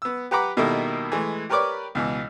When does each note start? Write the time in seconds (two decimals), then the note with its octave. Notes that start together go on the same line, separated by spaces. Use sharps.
0.02 B3 E6
0.31 G4 B4 F#5 A#5 B5 D6
0.57 B2 D#3 G3 A#3 E4 A4
1.12 E3 G#3 A3
1.50 G4 A#4 B4 C#5 D5 D6
1.95 C#2 B2 E3